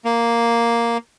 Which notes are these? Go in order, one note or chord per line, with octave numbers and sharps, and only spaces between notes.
A#3